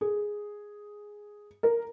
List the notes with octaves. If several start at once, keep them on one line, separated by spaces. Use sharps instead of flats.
G#4
A#4